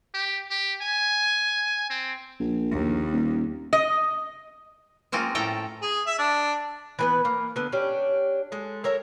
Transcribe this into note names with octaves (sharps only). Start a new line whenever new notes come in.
G4
G4
G#5
C4
A#1
D#2
D#1
D#5
G#3 A#3 C4 C#4 F4
A2 A3 A4 G5 A#5
G#4
E5
D4
E3 B3 B4
A#3
D3 B3
C#4 D4 G4
G#3 A3
A4 A#4 C#5 E5